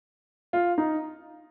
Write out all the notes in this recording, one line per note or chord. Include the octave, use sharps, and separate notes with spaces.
F4
D#4